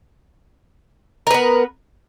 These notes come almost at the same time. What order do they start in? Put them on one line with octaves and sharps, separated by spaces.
A#4 B4 B3